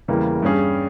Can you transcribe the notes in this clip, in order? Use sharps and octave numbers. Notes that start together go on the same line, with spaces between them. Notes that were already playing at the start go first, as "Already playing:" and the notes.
E2 C#3 E3 G3 A#3
G2 G3 C#4 G#4